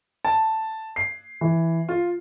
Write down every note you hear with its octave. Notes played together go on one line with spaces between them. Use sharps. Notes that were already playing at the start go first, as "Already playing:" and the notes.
A5
C7
E3
F4